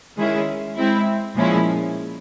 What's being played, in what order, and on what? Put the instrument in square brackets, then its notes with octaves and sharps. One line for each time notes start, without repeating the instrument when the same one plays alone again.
[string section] D#3 G#3 C#4 E4 G#4
G#3 C4 E4
A#2 F3 G#3 C#4 E4